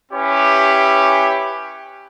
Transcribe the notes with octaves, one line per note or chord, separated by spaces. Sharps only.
C#4 E4 G4 B4 C#5